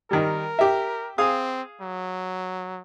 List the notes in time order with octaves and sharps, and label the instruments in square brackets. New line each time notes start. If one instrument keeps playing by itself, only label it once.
[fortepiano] D#3 G3 [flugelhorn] A#4
[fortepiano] G4 E5
[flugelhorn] C4 [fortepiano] G#4 F5 D#6
[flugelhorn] F#3